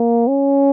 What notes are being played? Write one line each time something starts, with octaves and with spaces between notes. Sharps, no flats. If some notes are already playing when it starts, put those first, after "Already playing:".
Already playing: A#3
C#4